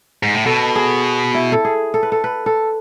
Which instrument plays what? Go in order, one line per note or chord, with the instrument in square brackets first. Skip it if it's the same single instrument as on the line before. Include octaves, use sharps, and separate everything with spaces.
[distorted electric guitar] G#2
A2
[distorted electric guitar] B2 [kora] A4
[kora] G#4
E4
A4
G#4
A4
B4
A4
B4
A4